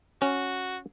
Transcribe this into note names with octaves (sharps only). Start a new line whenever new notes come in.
C#4 F#4